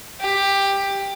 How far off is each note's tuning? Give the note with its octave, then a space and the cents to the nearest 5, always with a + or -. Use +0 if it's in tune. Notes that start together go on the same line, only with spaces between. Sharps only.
G4 +10